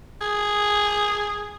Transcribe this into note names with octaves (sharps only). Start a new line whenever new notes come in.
G#4